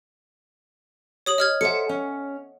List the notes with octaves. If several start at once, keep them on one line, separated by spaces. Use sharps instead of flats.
C#5 D#6 F#7
D#5 F6 G#6
A4 C5 E5 F#5 C#7
C#4